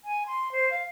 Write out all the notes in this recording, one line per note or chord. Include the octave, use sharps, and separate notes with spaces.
G#5
C6
C5
F5